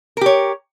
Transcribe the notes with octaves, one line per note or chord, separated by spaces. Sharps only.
G4 A#4 C#5